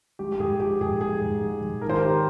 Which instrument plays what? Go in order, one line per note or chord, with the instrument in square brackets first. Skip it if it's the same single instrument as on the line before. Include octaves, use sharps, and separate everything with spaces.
[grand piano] G#3 G4
G4
G#2 G#4
F3 G4
G#2 G#4
G#3 G#4
G#2
G#3
G#2
D#3 A#4
C5
G4 A#4
D#3